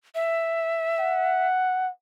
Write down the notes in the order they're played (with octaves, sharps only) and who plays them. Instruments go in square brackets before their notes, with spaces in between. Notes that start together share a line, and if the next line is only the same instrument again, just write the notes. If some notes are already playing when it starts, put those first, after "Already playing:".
[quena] E5
[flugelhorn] F#5